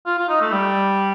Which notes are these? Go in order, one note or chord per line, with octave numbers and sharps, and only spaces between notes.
F4
F4
D#4
A3
G3